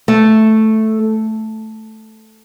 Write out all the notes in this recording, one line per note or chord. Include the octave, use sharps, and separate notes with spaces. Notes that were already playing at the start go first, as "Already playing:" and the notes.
A3